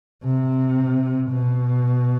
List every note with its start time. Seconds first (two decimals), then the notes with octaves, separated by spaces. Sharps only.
0.24 C3
1.30 B2